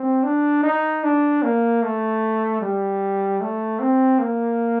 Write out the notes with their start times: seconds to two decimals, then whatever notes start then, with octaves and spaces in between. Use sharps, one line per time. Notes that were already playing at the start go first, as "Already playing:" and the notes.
Already playing: C4
0.24 D4
0.63 D#4
1.03 D4
1.42 A#3
1.82 A3
2.61 G3
3.41 A3
3.80 C4
4.19 A#3